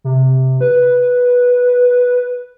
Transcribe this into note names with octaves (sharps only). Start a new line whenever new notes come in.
C3
B4